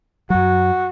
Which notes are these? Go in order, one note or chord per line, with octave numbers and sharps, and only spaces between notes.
F#2 F#3 F#4